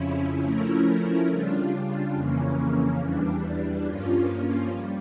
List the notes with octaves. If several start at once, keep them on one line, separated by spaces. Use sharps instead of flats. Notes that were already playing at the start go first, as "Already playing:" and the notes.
Already playing: F2 C#3 F3 C#4 E4
F3 A3 C#4 E4 A#4
C#3 G3 D4 F4
F2 C#3 E3 A#3 C#4
E2 E3 G3 D4
G2 F3 A#3 C#4 F4
G3